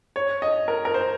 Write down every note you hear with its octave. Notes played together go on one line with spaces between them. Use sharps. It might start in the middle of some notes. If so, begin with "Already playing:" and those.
C#5
D#5
A#4
A#4
C5